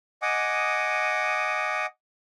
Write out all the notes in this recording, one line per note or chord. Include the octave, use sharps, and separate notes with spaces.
D#5 F#5 G#5 D6 D#6